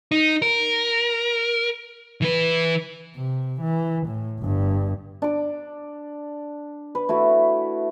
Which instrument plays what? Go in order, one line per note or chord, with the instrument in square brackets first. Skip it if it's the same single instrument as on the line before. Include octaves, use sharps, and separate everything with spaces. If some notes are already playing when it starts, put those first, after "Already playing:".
[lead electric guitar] D#4
A#4
E3 B4
[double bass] C3
E3
A2
G1 G2
[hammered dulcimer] D4 D6
B4
A3 E4 F#4